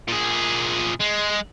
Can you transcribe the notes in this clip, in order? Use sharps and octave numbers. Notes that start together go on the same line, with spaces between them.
A#2 G#4
G#3